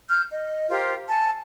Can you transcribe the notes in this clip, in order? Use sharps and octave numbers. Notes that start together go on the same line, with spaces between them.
F6 G6
D#5
F4 G4 A#4 C5
G#5 A5